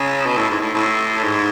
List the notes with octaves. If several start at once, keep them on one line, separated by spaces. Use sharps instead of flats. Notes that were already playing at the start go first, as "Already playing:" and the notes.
Already playing: C#3
B2
A2
G#2
A2
A2
G#2